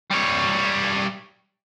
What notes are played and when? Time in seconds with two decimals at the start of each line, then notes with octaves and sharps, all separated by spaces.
0.11 G3 C#5